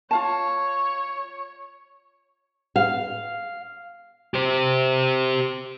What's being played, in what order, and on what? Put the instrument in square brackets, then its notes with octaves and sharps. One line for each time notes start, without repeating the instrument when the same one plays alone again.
[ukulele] F4 F5 A5 [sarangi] C#5
[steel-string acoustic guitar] F5
[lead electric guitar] G4 C5